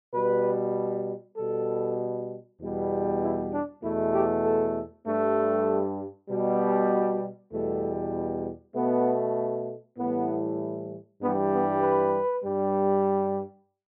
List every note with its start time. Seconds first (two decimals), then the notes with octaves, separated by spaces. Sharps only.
0.14 B2 G3 B4
1.37 B2 G3 A4
2.60 E2 B2 G3
3.22 E4
3.53 D4
3.83 E2 B2 A3 E4
4.14 G4
4.44 A4
5.06 G2 G3 A3
6.29 B2 G3
7.52 E2 B2 G3 A3
8.75 B2 A3 B3
9.98 A2 E3 G3 B3
11.21 G2 E3 G3 B3
11.52 B3
11.82 B4
12.44 G2 G3